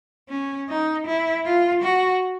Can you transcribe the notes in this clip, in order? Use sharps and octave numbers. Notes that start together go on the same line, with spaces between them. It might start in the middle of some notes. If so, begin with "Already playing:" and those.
C#4
D#4
E4
F4
F#4